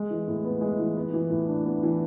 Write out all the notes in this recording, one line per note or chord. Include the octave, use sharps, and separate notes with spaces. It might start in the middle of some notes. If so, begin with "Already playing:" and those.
Already playing: G#3
E3
A2
B3
G#3
E3
B3
E3
A2
D4
B3
E3